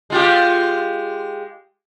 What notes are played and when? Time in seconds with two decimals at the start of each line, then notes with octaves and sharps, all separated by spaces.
0.10 G#3 F4 G4